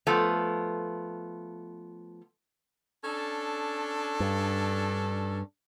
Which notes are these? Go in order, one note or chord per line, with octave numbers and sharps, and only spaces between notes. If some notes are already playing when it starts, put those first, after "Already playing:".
F3 A3 B3
C#4 D4 A4
G2